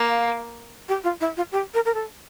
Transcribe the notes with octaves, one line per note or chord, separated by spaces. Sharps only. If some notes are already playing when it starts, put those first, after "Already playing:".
Already playing: A#3
F5
G4
F4
E4
F4
G4
A#4
A#4
A4